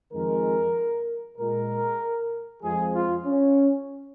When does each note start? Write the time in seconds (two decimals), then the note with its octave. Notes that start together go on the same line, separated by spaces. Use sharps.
0.13 F2 D#3 G#3 A#4
1.38 A#2 G#3 A#4
2.63 F2 F3 G#3 G#4
2.94 F4
3.26 C#4